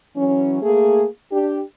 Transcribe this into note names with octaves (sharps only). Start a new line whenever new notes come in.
E3 F#3 C#4
A3 A#3 G#4
D4 G4